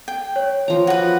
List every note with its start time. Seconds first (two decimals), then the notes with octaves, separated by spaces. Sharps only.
0.08 G5
0.36 C#5
0.68 F3 A#5
0.87 F#4 B4